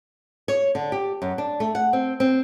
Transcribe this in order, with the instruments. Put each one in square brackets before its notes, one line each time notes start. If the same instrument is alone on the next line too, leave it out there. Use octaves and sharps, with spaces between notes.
[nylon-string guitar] C#5
D3
G4
F#2
D4
A3
F#5
C4
C4